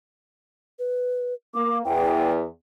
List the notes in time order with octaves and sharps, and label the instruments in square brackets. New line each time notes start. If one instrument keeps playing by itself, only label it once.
[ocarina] B4
[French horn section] A#3 [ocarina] D6
[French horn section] E2 [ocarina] G5